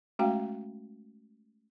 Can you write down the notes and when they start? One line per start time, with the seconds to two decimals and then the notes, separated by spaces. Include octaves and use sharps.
0.19 G#3 A3 C#4 F#4 F5 G5